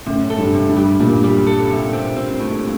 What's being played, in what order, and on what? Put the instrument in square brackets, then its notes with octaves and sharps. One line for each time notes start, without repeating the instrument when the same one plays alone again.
[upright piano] F#2 A2 [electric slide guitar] C3
[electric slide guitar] A4
[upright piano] G2
[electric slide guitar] C3
[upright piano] G2
[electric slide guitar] G3
[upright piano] G2 A#2 [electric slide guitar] G3
[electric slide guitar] G3
A4
C3
C4
C4
A2